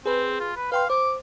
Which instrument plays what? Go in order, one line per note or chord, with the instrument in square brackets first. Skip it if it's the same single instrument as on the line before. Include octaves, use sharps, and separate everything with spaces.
[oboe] C4 [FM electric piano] G#4 B4
[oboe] F4
B4
[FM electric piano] B4 G5 C6 [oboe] F5
[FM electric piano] C5 [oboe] D6